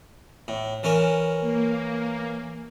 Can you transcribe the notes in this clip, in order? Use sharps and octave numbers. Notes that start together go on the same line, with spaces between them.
A2
E3 C#4 A#4
A#3